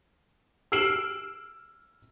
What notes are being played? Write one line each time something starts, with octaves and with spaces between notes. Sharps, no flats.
E6 F6 C7 D7 E7 F#7